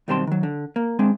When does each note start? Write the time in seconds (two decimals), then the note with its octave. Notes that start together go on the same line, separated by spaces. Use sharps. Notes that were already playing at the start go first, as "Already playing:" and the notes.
0.08 B1 D#3 G3 C4 A5 C6
0.27 D#3 F#3
0.43 D3
0.76 A#3
0.99 G#3 C4 D4